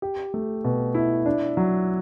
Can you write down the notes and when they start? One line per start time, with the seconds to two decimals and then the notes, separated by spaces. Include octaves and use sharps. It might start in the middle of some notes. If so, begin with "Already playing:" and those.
0.02 G4
0.34 A3
0.64 B2
0.95 E4
1.26 D4
1.57 F#3